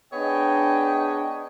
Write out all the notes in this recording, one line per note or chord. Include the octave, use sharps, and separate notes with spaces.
B3 D4 G#4 C#5 D#5 G5